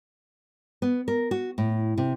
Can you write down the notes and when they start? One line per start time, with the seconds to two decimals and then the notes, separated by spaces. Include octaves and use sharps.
0.82 B3
1.08 A#4
1.31 F#4
1.58 A2
1.98 C3